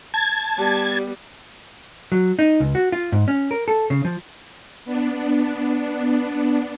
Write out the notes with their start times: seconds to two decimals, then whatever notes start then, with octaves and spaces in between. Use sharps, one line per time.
0.14 A5 G#6
0.57 G3 B3
2.12 F#3
2.39 D#4
2.60 C#2
2.75 F#4
2.92 F4
3.12 G#2
3.28 C#4
3.51 A#4
3.68 A4
3.90 C#3
4.05 F3
4.85 B3 D4